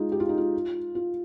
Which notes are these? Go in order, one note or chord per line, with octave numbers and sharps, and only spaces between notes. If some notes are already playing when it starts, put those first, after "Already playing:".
Already playing: G#3 D#4 F4
G4
F4
D#4
F4
F4